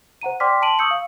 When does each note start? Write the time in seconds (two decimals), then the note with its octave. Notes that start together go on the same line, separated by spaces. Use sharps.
0.22 C5 F#5 A#5 D#7
0.40 D5 G5 C6 D6 F6 B6
0.62 A5 C6 D7 D#7 F#7
0.79 C#6 D#6 E6 G6 C#7 F#7
0.91 F5